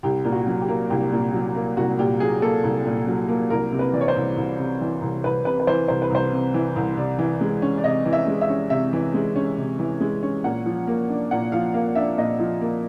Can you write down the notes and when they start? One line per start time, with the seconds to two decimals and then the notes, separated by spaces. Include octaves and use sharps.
0.03 C2 G4
0.25 A#2
0.32 F#4
0.47 F#3
0.61 G4
0.69 A#3
0.90 C2 G4
1.12 A#2
1.33 F#3
1.55 A#3
1.77 C2 F#4
1.98 A#2 G4
2.20 F#3 G#4
2.42 A#3 A4
2.64 C2
2.86 A#2
3.07 F#3
3.29 A#3
3.50 C2 A#4
3.72 C3
3.79 B4
3.93 E3 D5
4.01 C#5
4.08 C5
4.16 C2
4.37 C2
4.59 C3
4.81 E3
5.02 C2
5.24 C2 B4
5.45 C3 B4
5.60 B4
5.67 E3 C5
5.88 C2 C5
6.02 B4
6.10 C2 C5
6.32 C3
6.54 E3
6.76 C2
6.97 C3 D5
7.19 E3
7.41 G#3
7.62 C#4
7.78 D5
7.84 C3 D#5
8.05 E3
8.13 E5
8.27 G#3
8.41 E5
8.49 C#4
8.70 C3 E5
8.93 E3
9.14 G#3
9.36 C#4
9.58 C3
9.79 E3
10.01 G#3
10.23 C#4
10.44 A#2 F#5
10.66 F3
10.87 A#3
11.10 D4
11.31 A#2 F#5
11.52 F3 F5
11.74 A#3 F5
11.95 D4 E5
12.17 A#2 D#5
12.39 F3
12.61 A#3